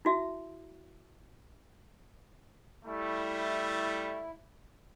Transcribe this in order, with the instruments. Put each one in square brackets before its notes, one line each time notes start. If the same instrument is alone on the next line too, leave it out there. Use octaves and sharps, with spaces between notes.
[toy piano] E4 F#4 E5
[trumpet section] G3 A3 [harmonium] E4